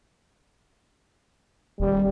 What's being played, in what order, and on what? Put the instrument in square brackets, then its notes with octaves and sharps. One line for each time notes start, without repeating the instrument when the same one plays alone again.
[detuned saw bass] D#1 [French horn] G3